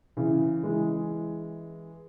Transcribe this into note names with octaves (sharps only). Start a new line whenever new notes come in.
C#3 E3
E3 G#3